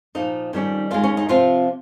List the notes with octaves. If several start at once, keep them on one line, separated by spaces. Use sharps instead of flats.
A#2 F3 A#3 D#4
F2 D#3 G3 A#3 C#4
D#2 D#3 G#3 F4
C#4
D#4
C3 F3 C4 F4